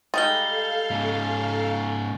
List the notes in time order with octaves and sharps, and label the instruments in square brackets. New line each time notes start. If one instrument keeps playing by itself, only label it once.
[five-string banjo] G3 G#3 D#4 [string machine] A4 F5 [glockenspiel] A6 G7
[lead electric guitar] G#2 C#3